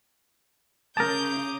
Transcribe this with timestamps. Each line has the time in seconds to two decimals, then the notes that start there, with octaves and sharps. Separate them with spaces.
0.97 C#3 A#4 A5 A#5 D6 D#6 G6